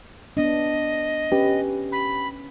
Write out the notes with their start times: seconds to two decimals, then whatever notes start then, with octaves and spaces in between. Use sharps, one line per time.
0.37 B3 D4 D#5
1.32 C#4 G4 B4
1.92 B5